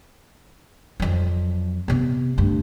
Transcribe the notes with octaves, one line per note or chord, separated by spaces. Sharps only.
F2 F#3
C3 B3
D2 G2